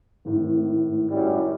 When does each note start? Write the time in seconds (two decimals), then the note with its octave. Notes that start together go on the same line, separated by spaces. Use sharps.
0.25 G#1 A2 D#3
1.10 F#2 G3